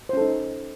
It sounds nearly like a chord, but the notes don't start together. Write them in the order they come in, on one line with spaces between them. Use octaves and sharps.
C5 C#4 A4 D#4